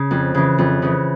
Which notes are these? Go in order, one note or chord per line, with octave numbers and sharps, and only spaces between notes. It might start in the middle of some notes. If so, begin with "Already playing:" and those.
Already playing: C#3
F2
C#3 E3
F2
C#3 E3